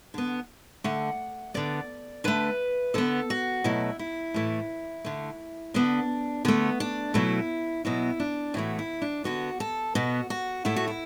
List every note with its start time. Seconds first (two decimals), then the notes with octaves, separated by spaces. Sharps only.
0.14 D3 B3
0.84 D3 A3 F#5
1.54 D3 B3 D5
2.24 D3 A3 B4
2.94 D3 B3 A4
3.30 F#4
3.64 B2 F#3 A3 E4
3.99 E4
4.34 A2 E3 A3
5.04 D3 A3
5.74 D3 B3 D4
6.45 D3 A3 B3
6.80 D4
7.14 B2 F#3 A3 E4
7.85 B2 F#3 B3 E4
8.20 D4
8.54 A2 E3 A3 F#4
8.79 E4
9.02 D4
9.24 D3 B3 F#4
9.60 A4
9.95 B2 B3 F#4
10.30 F#4
10.65 A2 A3 E4
10.76 F#4
10.88 E4